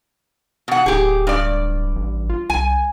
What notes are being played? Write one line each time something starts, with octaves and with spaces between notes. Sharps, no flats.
B2 F#5
D1 G4 G#4
G2 D5
A1
F4
C2 G#5